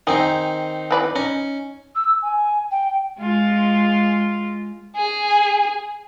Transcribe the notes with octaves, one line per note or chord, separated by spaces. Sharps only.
D#3 C4 D#4 G#4
E3 B4 D5
C#4 D#4
E6
G#5
G5
G#3 F4
G#4